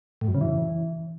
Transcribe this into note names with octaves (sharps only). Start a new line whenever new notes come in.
A2
F#2
C#3
E3